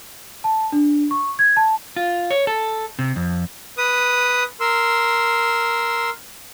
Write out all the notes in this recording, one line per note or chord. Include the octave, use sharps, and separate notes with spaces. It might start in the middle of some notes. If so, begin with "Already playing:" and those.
A5
D4
C#6
G#6
A5
F4
C#5
A4
C3
F2
B4 D#6
A#4 C6 E6